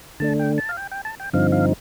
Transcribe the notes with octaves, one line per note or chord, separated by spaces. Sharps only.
D3 A3 D4 A5
G5
A5
F5
G5
G5
A5
G5
G2 D3 F3 C4 D#4 F5
F5